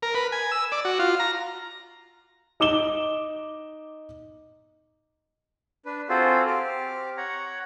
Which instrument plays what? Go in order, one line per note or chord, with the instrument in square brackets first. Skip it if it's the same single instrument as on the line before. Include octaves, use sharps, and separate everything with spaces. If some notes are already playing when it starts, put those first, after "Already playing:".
[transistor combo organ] A#4
B4
G#5
E6
D5
F#4
F4
A#5
[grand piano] D#4 D6 E7 G7
[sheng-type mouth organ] D4 B4
C4 F4 F#4 G#4 A4 C5
C4 G4 D6 F6
C#5 F#5 A#5